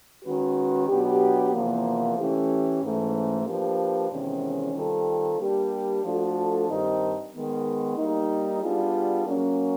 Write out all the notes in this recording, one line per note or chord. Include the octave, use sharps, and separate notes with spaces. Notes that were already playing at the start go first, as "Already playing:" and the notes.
D#3 G#3 C#4 F#4 B4
B2 F#3 B3 D4 G4
E2 C3 F3 A#3
E3 A3 C#4 E4 G4
G#2 E3 A3 C#4
F3 A#3 D4 G4 B4
E2 C3 D#3 G#3 C#4
D#3 G3 C4 F4 A4
G3 A#3 D4 G4
F3 A3 D4 F#4 A4
G2 D#3 G3 C4 D#4
D#3 G#3 B3
G3 A#3 D#4
G3 B3 D4 F4 G#4
F#3 A#3 C#4